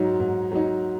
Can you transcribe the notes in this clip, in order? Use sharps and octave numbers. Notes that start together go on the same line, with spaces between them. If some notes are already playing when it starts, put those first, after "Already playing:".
Already playing: G#2 F#3 D#4
G#2
F#3 D#4